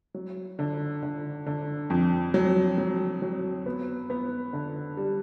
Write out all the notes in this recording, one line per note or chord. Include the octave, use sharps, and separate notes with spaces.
F#3
D3
D3
D3
F2
F#3
F#3
F#3
B3
B3
D3
G3